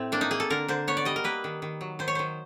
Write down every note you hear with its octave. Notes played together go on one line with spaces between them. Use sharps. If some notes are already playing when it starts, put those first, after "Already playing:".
Already playing: A2 C4
A#3 D4
D#4
A#3 G#4
A4
D3 A#4
D3 C5
B3 C#5
D5
G3 D#5
A#4
A#3 B4
D#3
D#3
F#3
D#3 C5
C#5
D#3 C5